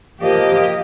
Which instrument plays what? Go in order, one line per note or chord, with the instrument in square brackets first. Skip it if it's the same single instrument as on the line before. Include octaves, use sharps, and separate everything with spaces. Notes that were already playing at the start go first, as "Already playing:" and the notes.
[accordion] F3 A#3 [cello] G4 D#5